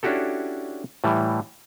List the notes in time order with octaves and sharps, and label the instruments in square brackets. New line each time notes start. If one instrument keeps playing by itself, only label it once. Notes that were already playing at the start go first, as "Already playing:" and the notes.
[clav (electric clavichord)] C#4 D4 E4 F#4 G4 A4
A2 E3 G3